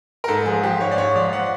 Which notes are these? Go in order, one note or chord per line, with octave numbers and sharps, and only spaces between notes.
A#4
G#2 A4
F3 G#4
F3 G4
G#2 C#5
D5
G#2 C#5
F3 D5
F3 F#5